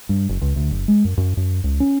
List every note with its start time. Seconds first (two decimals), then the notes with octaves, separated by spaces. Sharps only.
0.09 G2
0.29 F#1
0.41 C#2
0.56 D2
0.71 F#1
0.88 G#3
1.05 F#2
1.17 F#2
1.37 F#2
1.64 C#2
1.80 C#4